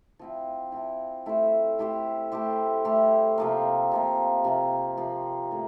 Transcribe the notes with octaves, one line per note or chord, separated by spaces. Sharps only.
F3 C4 E4
F3 C4 E4
A3 E4 G4 C5
A3 E4 G4 C5
A3 E4 G4 C5
A3 E4 G4 C5
C3 F3 A#3
C3 F3 A#3
C3 F3 A#3
C3 F3 A#3
A2 G3 A#3